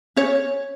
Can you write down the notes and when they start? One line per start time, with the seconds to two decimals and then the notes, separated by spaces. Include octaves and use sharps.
0.16 C#4 C#5